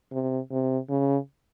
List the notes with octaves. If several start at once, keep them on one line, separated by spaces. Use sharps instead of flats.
C3
C3
C#3